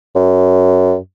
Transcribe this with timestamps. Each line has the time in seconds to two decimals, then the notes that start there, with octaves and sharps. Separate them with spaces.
0.15 F#2